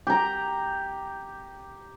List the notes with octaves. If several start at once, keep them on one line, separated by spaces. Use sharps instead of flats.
G4 A#5